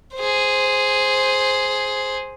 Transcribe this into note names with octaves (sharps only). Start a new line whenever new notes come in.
G#4 C5